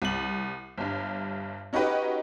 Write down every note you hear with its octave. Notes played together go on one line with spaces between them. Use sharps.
C2 F#7
G1 G2
C#4 D#4 F#4 G4 B4